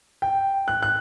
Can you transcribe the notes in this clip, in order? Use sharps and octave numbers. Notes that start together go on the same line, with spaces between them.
G5
F#6
F#6